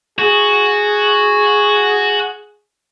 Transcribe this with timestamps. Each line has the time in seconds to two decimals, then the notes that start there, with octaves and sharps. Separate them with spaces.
0.19 F#4 G#4